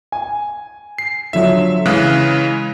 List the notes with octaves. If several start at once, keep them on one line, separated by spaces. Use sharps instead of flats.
G#5
C7
D3 F3 F#3 E5
C#3 E3 G#3 F5 F#6